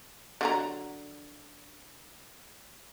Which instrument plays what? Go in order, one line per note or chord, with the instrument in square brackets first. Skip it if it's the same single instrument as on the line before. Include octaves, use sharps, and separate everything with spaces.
[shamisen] D3 F#3 A#5